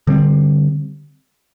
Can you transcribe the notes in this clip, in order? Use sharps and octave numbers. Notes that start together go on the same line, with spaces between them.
D3 G3 C4